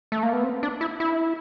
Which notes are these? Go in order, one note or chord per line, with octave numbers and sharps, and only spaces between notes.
A3
A#3
B3
C4
D4
E4
E4